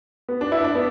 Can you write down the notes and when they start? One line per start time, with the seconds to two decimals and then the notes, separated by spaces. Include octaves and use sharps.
0.29 B3
0.41 D4
0.52 E4
0.64 D4
0.75 B3